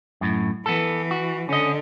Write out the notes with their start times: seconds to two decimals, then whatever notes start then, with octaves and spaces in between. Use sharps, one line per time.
0.21 F#2 A2
0.66 E3 B3 A4
1.11 F#4
1.49 D3 C#4 D#5